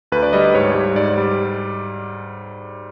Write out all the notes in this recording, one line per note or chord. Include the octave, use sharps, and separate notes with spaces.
D2 B4
D5
G3 D#5
G#2 C#5
G3
G#2 D5
G3